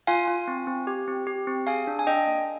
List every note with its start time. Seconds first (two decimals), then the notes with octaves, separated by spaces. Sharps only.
0.07 F4 F5 G#5
0.28 F4
0.48 C4
0.67 C4
0.87 G4
1.08 C4
1.27 G4
1.47 C4
1.67 G#4 F5 G#5
1.87 D4
1.99 G#5
2.07 D4 D#5 G5
2.27 A#3